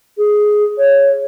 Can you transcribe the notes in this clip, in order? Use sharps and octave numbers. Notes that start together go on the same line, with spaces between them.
G#4
C#5